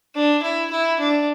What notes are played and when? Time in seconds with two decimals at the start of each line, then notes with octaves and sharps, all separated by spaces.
0.15 D4
0.43 E4
0.71 E4
0.99 D4